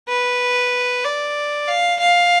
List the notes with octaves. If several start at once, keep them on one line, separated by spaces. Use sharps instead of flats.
B4
D5
F5
F5